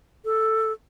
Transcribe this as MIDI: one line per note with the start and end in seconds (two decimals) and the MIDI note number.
0.25 0.72 69